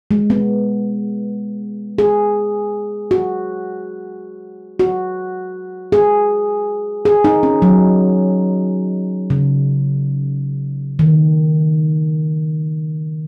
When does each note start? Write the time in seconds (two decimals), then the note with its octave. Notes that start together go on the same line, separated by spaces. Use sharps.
0.11 G#3
0.30 B3
1.98 G#4
3.11 F#4
4.80 F#4
5.92 G#4
7.05 G#4
7.24 D#4
7.43 C#4
7.62 F#3
9.30 C#3
10.99 D#3